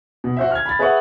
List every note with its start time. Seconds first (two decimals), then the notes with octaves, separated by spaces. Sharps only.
0.24 B2
0.37 F#4 C5 E5
0.51 F6 G#6
0.66 B5 A6
0.79 G#4 B4 E5 F#5 C#6